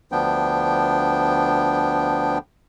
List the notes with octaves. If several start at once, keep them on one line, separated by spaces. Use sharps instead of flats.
D2 F3 B3 D4 G5